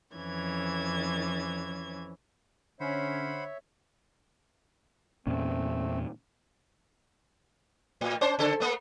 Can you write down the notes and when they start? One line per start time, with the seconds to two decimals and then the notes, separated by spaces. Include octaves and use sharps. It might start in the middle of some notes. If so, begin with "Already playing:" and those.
0.15 F2 E3 C#4 G#6
2.80 D3 C#4 C5 C#5 E5 F#5 B5
5.27 E2 A#2 A3 C4 C#4
8.01 A2
8.21 C#4 C5
8.39 C#3 A4
8.60 A3 A#3